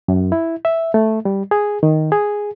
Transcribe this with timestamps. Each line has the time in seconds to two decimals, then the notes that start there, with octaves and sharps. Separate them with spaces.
0.08 F#2
0.32 E4
0.65 E5
0.94 A3
1.25 G3
1.51 G#4
1.83 D#3
2.12 G#4